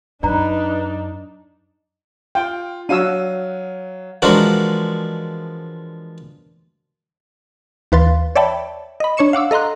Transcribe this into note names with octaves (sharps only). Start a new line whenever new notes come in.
F#2 D4 D#4 B4 D5 A#5
F4 G5
F#3 D4 F#4 F5 E6 D#7
E3 F3 G#3 D4 F#4 A#4
D#2 E3 B4 F5 C6 A6
C#5 D5 E5 G5 A5 B5
D#5 B5
D4 C#5 C#6 C#7 E7
F5 F#5 D6 E6
A4 D#5 A#5 C6 F#6